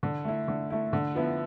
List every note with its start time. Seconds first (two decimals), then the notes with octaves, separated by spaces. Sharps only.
0.03 D3
0.25 A3 E4
0.48 D3
0.70 A3 E4
0.93 D3
1.15 F3 B3 E4